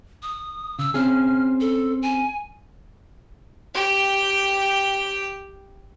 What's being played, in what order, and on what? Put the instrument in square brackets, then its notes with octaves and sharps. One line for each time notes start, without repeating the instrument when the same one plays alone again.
[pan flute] D#6
[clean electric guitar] C#3 [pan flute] E6
[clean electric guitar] C4 C#4 G#4 [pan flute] F6
[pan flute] A4
G#5
[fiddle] G4 G5